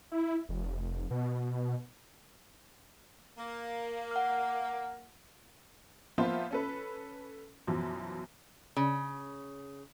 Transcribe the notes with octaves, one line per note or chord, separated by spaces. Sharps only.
E4
F1
B2
A#3
F#5 F6
F3 A#3 B3 F4 C5 E5
C#4 A4 B4
F#2 B2 E3 F3
C#3